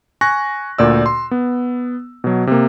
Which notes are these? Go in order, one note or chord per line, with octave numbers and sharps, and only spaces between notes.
G#5 C#6 F#6 A#6
D2 A#2 D5 E6
C6
B3
B2 F#3
C3 A#3